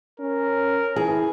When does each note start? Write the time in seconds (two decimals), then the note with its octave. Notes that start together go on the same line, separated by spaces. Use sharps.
0.20 C#4 A#4
0.96 E3 G#4